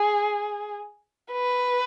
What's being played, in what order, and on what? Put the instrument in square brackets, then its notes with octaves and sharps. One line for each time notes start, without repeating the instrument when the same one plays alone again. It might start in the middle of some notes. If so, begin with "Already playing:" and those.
Already playing: [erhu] G#4
B4